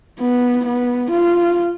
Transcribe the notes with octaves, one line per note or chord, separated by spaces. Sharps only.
B3
B3
F4